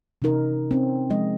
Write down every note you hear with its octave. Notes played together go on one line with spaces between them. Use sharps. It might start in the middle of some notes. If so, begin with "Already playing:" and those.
C3 E3 C#4 D#4 A#4
C4 C#4
F3 G#3 D#5